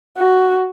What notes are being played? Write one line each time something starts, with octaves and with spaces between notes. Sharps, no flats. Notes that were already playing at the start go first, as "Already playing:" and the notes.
F#4